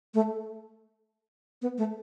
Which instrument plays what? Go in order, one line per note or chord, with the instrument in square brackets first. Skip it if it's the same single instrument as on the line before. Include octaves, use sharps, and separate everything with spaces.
[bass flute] A3
B3
A3